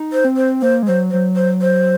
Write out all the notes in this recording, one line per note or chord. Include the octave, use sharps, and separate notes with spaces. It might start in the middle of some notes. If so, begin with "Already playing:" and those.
Already playing: D#4
C5
C4
C5
A#3 C5
G#3
F#3 C5
F#3 C5
C5
C5